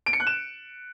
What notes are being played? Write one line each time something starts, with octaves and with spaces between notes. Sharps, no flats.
D7
C#7
F#6
E7